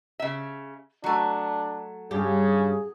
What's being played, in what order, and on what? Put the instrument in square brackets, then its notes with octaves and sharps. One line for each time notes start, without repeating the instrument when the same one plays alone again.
[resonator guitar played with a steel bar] C#3 E5
[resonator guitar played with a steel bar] F#3 A3 [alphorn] D4
[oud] G2 G4 [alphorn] C#3 [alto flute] G#4